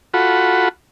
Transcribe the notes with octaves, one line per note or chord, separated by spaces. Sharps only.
F4 F#4 A4 F#5 B5